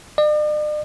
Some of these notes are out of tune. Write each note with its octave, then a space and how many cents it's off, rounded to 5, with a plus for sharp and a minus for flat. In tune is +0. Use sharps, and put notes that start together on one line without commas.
D5 +45